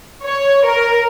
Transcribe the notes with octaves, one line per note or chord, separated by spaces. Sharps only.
C#5
A#4